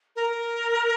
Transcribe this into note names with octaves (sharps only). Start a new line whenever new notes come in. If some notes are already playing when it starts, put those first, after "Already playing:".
A#4